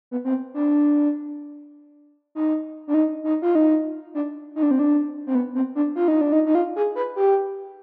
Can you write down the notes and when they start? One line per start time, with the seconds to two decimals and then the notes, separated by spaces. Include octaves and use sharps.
0.11 B3
0.25 C4
0.54 D4
2.35 D#4
2.88 D4
2.94 D#4
3.24 D#4
3.42 F4
3.55 D#4
4.14 D4
4.56 D#4
4.63 D4
4.71 C4
4.79 D4
5.27 C4
5.35 B3
5.55 C4
5.75 D4
5.96 F4
6.08 D#4
6.21 D4
6.32 D#4
6.46 D#4
6.55 F4
6.76 G#4
6.96 B4
7.16 G4